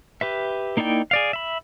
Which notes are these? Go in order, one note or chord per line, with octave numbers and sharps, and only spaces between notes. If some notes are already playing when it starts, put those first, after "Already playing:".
G4 B4 E5
A#3 D#4 E4 D5 G5
G#4 D5 F5
E5 B5